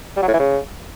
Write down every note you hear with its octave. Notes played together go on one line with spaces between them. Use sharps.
G3
F#3
A2
E3
C#3